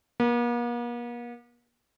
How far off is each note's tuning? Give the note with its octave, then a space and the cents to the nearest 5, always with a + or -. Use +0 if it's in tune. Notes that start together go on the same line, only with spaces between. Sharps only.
A#3 +45